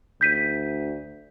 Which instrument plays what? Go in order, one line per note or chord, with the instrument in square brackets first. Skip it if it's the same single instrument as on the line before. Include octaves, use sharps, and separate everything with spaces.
[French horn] D2 [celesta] G6 B6 D#7